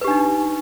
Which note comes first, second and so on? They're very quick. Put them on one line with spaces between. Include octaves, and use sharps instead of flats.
B4 G4 D4 D#4